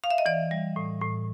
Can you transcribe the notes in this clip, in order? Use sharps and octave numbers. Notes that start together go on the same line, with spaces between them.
F5
E5
D#5
E3 D5
G3
A2
A2